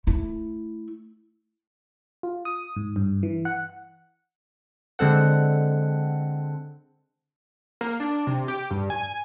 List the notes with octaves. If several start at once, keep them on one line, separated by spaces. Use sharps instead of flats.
A3 E4
F4
D#6
G#2
G2
E3
F#5
D3 G#3 C4 A4 F#5
A#3
D4
C3
G4
G2
G#5